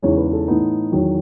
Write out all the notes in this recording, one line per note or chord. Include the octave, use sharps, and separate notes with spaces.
E2 C#3 G#3 D#4 C#5
B4
A4
A2 E3 B3 D#4
E2 D#3 F#3